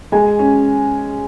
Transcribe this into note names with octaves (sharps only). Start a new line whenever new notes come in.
G#3 G#5
C#4